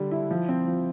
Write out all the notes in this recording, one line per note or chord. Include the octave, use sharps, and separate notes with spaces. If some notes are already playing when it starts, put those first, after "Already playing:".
Already playing: D3 G3
E4
F3
C4
F3